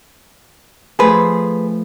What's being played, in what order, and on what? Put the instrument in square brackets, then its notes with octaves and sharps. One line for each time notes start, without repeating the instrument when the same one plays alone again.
[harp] F3 A3 C5 [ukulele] G#4 B4